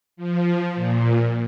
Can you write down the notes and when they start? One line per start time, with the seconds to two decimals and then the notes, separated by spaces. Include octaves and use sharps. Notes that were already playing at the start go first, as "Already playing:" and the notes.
0.17 F3
0.75 A#2